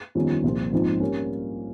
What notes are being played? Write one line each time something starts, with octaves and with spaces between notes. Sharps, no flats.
G1 F2 D#3 G3 C#4
C2 A#2 F3 C4
A#1 G#2 F3 C4 D#4
G3 A#3 C#4